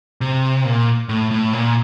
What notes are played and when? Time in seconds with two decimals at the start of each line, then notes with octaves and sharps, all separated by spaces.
0.21 C3
0.65 A#2
1.09 A2
1.31 A2
1.53 A#2